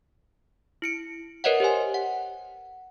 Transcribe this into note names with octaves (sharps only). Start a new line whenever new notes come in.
E4 C#7 D7
A#4 B4 C#5 D#5 E5 F#5
G4 C5 G#5
F#5